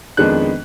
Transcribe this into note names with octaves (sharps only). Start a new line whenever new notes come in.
F2 D#3 G#3 B3 D4 F#6